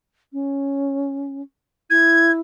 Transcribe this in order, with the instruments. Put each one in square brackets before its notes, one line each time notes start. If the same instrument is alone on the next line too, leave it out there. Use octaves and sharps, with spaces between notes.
[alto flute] C#4
[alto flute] E4 [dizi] G#6